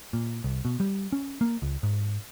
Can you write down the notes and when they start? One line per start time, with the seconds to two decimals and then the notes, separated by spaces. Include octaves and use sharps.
0.13 A#2
0.44 C2
0.65 B2
0.80 G3
1.12 C#4
1.41 A#3
1.62 C#2
1.83 G#2